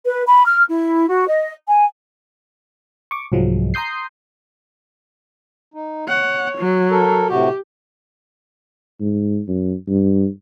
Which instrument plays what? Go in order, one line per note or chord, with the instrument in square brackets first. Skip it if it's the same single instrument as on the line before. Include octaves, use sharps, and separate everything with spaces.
[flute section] B4
B5
F6
E4
F#4
D#5
G#5
[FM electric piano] C#6 D6
C2 G#2 F3 F#3 G#3
A#5 C6 D#6 G6 C7
[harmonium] D#4
[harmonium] C#5 [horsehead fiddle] F#5
[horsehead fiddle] F#3
[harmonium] A4 A#4
[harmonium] A2 C3 F#4 [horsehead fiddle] G4
[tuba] G#2
F#2
G2